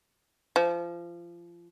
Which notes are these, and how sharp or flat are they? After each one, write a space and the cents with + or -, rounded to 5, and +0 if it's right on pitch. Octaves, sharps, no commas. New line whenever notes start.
F3 -25